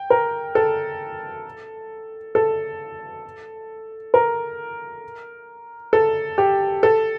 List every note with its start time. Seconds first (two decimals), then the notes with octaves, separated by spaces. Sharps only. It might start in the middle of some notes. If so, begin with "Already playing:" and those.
Already playing: G5
0.10 A#4
0.55 A4
2.35 A4
4.14 A#4
5.93 A4
6.38 G4
6.83 A4